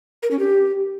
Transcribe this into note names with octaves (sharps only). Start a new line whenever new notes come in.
A#4
C#4
G4